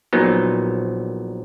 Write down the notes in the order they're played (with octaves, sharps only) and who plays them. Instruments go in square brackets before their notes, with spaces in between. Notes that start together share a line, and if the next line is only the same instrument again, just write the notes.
[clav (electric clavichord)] A#1 A#2 F#3 B3 D#4